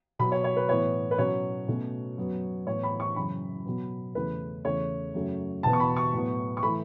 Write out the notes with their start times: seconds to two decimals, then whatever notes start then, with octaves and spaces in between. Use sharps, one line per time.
0.19 B2 F#3 B3 B5
0.32 C#5
0.44 C#5
0.57 B4
0.69 A2 E3 B3 C#5
1.11 B4
1.18 B2 F#3 C#4 C#5
1.68 B2 A3 C#4
2.17 F#2 F#3 B3
2.67 A2 E3 B3 C#5
2.83 B5
3.00 C#6
3.16 F#2 C#3 E3 C#4 B5
3.66 B2 F#3 B3
4.15 E2 C#3 A3 C#4 B4
4.65 E2 C#3 A3 C#5
5.14 F#2 C#3 F#3 A3
5.63 E2 B2 B3 A5
5.73 C#6
5.80 B5
5.97 C#6
6.13 A2 F#3 B3
6.57 C#6
6.63 E3 A3 B5